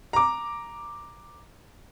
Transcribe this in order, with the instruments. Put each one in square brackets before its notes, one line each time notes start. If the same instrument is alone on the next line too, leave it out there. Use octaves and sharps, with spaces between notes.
[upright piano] A#5 D6